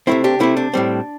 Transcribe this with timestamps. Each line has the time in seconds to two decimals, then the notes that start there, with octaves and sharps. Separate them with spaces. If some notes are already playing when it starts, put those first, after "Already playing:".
0.07 C3 A3 C4 E4
0.24 D4 G4
0.40 C3 A3 C4 E4
0.57 D4
0.74 A2 G3 C4